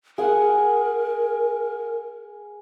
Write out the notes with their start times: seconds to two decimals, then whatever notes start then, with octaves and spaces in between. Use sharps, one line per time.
0.18 G#4 A#4 F#5